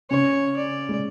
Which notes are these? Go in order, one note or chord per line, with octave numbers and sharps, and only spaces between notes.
C#3 C#4 C#5
D5
G#3